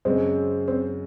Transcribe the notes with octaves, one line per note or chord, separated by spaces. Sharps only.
F#2 C#3 G#3 C4
C4